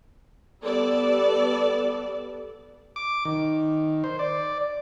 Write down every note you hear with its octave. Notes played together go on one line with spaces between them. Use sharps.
G3 B3 A4 D5
D6
D#3
C5
D5